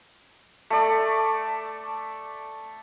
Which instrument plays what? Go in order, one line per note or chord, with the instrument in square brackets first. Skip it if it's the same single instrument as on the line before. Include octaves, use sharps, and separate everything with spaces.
[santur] A3 D5